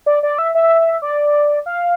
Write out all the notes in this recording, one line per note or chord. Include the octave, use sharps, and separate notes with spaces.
D5
D5
E5
E5
D5
F5